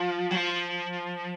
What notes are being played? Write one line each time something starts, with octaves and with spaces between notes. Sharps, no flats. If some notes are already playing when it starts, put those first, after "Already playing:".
Already playing: F3
F#3
F3